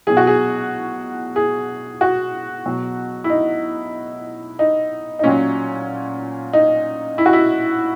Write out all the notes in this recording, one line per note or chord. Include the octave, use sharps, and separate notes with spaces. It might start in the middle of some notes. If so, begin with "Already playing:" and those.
B2 F#3 G#4
F#4
G#4
G#4
F#4
B2 F#3
E4
D#4
D#4
D#4
A#2 F#3 C#4
D#4
E4
F#4
E4